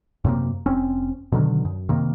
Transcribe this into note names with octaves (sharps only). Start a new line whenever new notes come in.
F#2 C3 A#3
F1 C4 C#4
B2 D3 D#3 F#3
F#2
C3 D#3 A#3